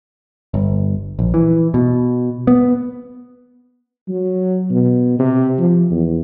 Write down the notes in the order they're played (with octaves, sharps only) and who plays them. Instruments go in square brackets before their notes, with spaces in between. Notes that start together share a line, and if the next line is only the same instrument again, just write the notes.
[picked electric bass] G1
A#1
E3
B2
B3
[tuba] F#3
B2
C3
F3
E2